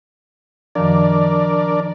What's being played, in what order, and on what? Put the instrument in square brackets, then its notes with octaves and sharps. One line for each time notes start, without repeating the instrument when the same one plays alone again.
[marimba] F#2 D#3 F3 [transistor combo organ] D4 A#4 D5